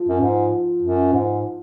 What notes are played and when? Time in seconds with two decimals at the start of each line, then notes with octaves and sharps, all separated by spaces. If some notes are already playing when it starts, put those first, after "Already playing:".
Already playing: F3
0.08 F#2
0.21 G#2
0.82 F#2
1.12 G#2